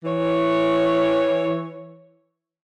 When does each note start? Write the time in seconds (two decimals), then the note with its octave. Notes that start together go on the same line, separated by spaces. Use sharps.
0.04 E3 C#5